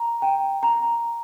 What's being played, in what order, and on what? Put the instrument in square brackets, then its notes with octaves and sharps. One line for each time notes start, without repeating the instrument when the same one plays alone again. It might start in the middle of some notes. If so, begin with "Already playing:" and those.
Already playing: [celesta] A#5
G5
A#5